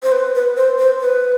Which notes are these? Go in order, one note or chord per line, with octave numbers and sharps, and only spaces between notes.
C5
B4
B4
C5
C5
B4